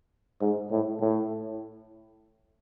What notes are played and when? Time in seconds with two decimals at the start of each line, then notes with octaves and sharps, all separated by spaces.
0.41 G#2
0.71 A2
1.01 A2